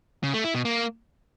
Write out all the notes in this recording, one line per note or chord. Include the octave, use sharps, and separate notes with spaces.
C#3
A3
E4
B2
A#3